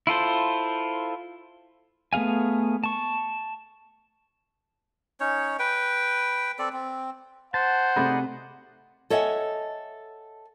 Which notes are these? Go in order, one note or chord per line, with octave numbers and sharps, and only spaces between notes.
E4 F4 A4 C5
A3 B3 G#4 F5 G#5
A5 C#6
C#4 D#4 C#5
B4 G5
C4 A4 D5
C4
C5 F#5 A5
C3 A3 D#4 G#4 D5 B5
A4 C#5 D#5 E5 F#5 G#5